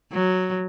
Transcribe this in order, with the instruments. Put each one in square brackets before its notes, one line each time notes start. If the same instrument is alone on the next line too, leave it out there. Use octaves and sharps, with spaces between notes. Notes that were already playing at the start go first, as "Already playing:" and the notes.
[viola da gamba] F#3